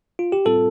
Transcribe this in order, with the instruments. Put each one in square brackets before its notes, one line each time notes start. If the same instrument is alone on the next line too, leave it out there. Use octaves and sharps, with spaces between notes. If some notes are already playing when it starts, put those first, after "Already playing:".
[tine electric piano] F4
G4
A2 G3 C4 F4 A4